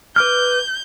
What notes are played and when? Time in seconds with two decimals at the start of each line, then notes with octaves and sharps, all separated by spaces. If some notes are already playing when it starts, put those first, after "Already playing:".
0.16 B4 D6 F6 G6